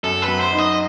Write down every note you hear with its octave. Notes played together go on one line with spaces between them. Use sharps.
F#2 A4
B4
F#3
C5
D#4
D#5